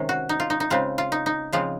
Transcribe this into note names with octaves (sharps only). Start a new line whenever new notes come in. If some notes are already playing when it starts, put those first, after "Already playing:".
Already playing: C3 D#3 G#3 C#4
F#4
D#4
F4
D#4
D#4
C#3 G#3 C4 F4
F4
D#4
D#4
C#3 F3 G#3 C4 F4